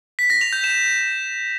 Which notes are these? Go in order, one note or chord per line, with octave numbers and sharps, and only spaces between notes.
B6
A#6
F7
G6
E7